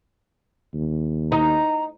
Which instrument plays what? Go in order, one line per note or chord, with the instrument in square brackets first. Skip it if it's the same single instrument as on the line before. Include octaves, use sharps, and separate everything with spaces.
[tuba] D#2
[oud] D#4 [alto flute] A#5